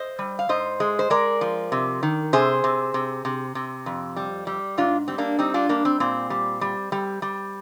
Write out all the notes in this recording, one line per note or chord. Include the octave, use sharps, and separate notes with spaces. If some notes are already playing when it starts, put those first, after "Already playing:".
Already playing: C5 D#5
G3
F5
G#2 C5 D#5
G#3
C5
G#3 A#4 D5
F3
C3
D#3
C3 G#4 C5
C3
C3
C3
C3
F2
G3
G3
G#2 D4 F4
G3 C4
A#3 D4
G3 C4 D#4
D4 F4
G3 A#3 D4
C4
A#2 C4
G3
G3
G3
G3